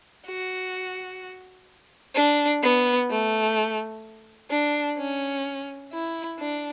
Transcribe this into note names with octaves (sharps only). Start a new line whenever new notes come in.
F#4
D4
B3
A3
D4
C#4
E4
D4